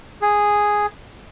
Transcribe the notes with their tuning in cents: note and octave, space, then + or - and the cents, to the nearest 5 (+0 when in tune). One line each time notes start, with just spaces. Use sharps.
G#4 -5